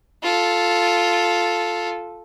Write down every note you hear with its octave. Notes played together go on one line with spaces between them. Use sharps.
F4 A4